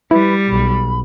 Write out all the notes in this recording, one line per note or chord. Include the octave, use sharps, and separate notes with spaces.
G3 E4 B4
B1 B5